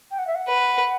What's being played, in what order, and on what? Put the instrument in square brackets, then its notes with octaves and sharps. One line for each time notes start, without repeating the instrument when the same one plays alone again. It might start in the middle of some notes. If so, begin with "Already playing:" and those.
[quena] G5
F#5
E5
F#5
[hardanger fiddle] B4